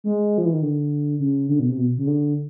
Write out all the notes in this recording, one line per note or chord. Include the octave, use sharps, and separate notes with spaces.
G#3
F3
E3
D#3
D3
C#3
D3
B2
C3
B2
C#3
D3